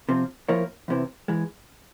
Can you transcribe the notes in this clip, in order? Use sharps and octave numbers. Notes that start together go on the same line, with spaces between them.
C3 F3 C4
F3 A#3 E4 A#4 C#5
E2 C3 E3
E3 G#3